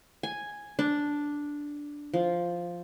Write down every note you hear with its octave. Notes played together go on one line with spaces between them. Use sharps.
G#5
D4
F3